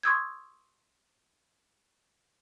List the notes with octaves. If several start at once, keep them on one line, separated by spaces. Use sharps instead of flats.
C6 C#6 D#6 E6 G6 G#6